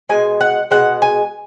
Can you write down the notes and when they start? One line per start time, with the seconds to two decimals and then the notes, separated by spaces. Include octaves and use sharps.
0.09 B2 G#3 G#5
0.41 F#5
0.71 B2 G#3 F#5
1.02 G#5